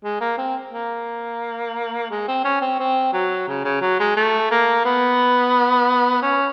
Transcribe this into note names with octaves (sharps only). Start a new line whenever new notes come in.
G#3
A#3
C4
A#3
G#3
C4
C#4
C4
C4
F#3
C#3
C#3
F#3
G#3
A3
A#3
B3
C#4